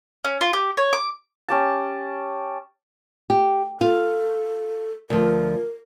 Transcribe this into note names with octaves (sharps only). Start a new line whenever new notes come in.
C#4
F4
G4
C#5
D6
C#4 G4 A5
G4
F4 A4 F5
D2 F3 A#4